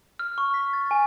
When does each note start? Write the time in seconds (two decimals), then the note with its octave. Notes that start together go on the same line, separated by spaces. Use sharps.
0.19 F6
0.38 C#6
0.54 B6
0.73 A6
0.91 G#5